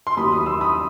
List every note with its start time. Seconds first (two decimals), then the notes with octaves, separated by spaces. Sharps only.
0.07 C6
0.16 D#2 D#3 F#3 B5 D#6
0.32 B5 D#6
0.46 C6 E6
0.61 B5 D#6